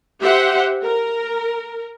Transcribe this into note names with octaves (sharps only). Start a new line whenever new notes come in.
G4 C5 E5 F#5
A#4